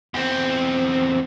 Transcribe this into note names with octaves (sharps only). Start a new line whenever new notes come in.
E2 C4